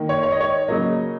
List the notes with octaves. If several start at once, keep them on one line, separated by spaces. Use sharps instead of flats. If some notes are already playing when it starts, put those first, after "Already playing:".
Already playing: D#3 A#3
C#5
C#5
D#5
C#5
C#3 F#3 A#3 D#5